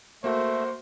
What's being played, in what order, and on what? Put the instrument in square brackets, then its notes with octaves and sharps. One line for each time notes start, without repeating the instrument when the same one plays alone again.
[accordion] A3 [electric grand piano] A#3 F#4 [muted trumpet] C5